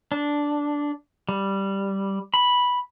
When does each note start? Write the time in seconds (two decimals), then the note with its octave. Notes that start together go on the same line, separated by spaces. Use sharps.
0.12 D4
1.29 G3
2.34 B5